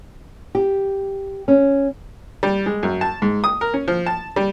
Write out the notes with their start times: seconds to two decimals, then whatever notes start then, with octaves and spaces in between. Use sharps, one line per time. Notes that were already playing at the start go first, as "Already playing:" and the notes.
0.55 G4
1.48 C#4
2.43 G3
2.66 G#3
2.83 F#2
3.01 A5
3.22 G#2
3.44 D#6
3.61 A#4
3.74 C#4
3.88 F3
4.06 A5
4.36 G3